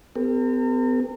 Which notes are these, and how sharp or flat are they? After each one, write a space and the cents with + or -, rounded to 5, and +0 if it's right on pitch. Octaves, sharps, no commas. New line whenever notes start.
B3 +45 G4 +30 A#4 -40